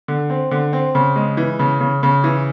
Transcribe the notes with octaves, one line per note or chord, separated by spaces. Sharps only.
D3
C4
D3
C4
C#3
G#3
E3
C#3
C#3
C#3
E3